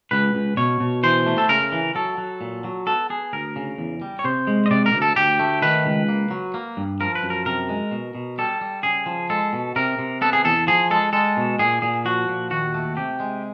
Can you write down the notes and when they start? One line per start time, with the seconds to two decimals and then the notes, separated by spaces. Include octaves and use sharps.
0.11 C#2 B4
0.35 C#2
0.57 B2 C#5
0.80 B2
1.03 E3 C5
1.26 A3
1.38 A4
1.49 C#3 A#4
1.72 E3
1.95 F#3 A4
2.18 F#3
2.41 A#2
2.64 F#3
2.87 B3 A4
3.10 B3 G#4
3.33 D2 A#4
3.56 C#3
3.78 E2
4.02 G3
4.19 C#5
4.24 C3 C5
4.47 G#3
4.66 D#5
4.71 C3 D5
4.86 A#4
4.94 D2
5.02 A4
5.16 D2 G4
5.39 A3
5.62 D#3 B4
5.86 C#2
6.08 A#3
6.31 F#3
6.54 A#3
6.77 G2
7.00 F3 A#4
7.15 B4
7.23 F#2
7.30 A#4
7.46 C3 A#4
7.69 G#3
7.91 B2
8.15 B2
8.38 G3 A4
8.61 G3
8.83 C#3 G#4
9.06 F3
9.30 G#3 A4
9.53 B2
9.76 C3 A#4
9.99 C3
10.21 B3 A4
10.33 G#4
10.45 E2 A4
10.67 F3 G#4
10.91 G#3 A4
11.13 G#3 A4
11.37 B2
11.59 A#2 G#4
11.82 A#2 G#4
12.05 F3 F#4
12.28 A#2
12.51 D#2 F#4
12.74 A3
12.97 C3 G4
13.20 G#3